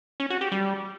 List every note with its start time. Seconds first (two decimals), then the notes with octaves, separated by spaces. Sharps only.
0.20 C#4
0.30 F#4
0.41 G4
0.52 G3